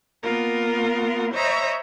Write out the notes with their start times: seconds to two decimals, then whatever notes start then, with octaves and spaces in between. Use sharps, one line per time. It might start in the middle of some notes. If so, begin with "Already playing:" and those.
0.23 A#3 B3 F4 A#4
1.33 C5 C#5 D#5 E5 A#5 B5